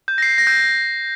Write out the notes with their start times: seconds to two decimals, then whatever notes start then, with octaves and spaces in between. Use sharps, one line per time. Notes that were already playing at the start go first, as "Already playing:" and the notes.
0.08 G6
0.18 A#6
0.22 C7
0.38 A#6
0.47 G6